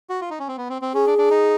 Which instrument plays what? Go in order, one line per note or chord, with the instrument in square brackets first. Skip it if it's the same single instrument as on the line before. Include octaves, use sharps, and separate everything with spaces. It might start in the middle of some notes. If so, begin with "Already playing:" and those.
[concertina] F#4
F4
D#4
C#4
C4
B3
C4
C4
[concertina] C#4 [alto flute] G#4
[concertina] D4
D4
D#4